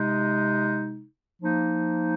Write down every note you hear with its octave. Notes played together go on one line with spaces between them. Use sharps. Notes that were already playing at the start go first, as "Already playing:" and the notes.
Already playing: C3 G#3 D#4
F3 A#3 D#4